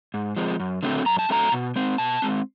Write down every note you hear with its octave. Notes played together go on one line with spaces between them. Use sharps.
G#2
F3 G#3 C4
F#2
D3 F#3 A3 C4
F#2 A#5
A5
D3 F#3 A3 C4 A#5
B2
G#3 C4
B2 A5
G#3 C4